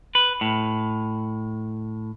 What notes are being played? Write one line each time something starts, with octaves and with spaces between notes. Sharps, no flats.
B4
A2